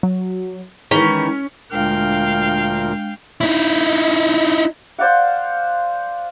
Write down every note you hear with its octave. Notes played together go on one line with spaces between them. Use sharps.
F#3
D#3 E3 G#3 C#4 C#5
D2 A#2 G#3 D4 A#4 F5 G5
D#4 E4
C5 D5 F5 F#5